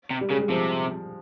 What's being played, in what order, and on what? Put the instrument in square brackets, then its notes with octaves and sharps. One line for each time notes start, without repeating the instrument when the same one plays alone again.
[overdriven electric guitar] C3
[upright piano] G3
[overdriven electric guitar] C#3 [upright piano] G#3
[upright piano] G3
[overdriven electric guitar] C3 [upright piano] F3